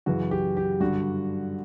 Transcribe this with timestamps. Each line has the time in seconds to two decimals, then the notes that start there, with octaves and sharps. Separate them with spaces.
0.06 F#2 C#3 E3 F#4
0.31 G4
0.57 G4
0.80 G2 D3 F#4